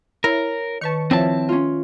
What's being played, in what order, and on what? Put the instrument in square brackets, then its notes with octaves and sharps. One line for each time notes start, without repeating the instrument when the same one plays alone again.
[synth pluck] E4 [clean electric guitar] A#4 [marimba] C#5
[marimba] D#3 B4 [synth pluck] A5 C#6 C#7
[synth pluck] F3 [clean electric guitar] C4 E4 A5 [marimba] C#5 E5
[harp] C#4 F4